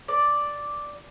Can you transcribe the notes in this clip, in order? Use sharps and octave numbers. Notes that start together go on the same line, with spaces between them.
D5